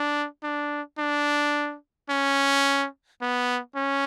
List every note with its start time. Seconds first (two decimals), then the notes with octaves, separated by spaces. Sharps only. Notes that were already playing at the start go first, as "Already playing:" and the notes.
Already playing: D4
0.43 D4
0.98 D4
2.10 C#4
3.21 B3
3.76 C#4